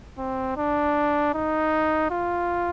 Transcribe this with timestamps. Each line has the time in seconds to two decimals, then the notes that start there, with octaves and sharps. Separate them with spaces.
0.18 C4
0.57 D4
1.34 D#4
2.10 F4